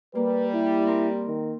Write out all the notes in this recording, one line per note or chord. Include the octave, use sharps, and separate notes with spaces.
G3 A#3 B4
E4
C4 A#4 C5
D#3